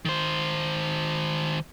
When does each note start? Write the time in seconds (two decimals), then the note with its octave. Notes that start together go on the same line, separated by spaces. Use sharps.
0.05 D#3 C5